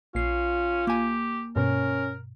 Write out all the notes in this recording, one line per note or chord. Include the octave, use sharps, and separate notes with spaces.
A#1 C#4 F4 C7
A#3 G4 G#5
G2 B2 C#4 A#4